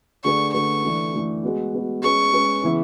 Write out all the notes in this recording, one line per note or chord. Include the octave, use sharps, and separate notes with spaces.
D3 A3 D4 G#4 B4 C#6
D3 A3 D4 G#4 B4 C#6
E3 A3 D4
E3 A3 D4
G#3 B3 F#4
G#3 B3 F#4
G#3 C#4 G#4 B4 C#6
G#3 C#4 G#4 B4
C#3 E3 B3 E4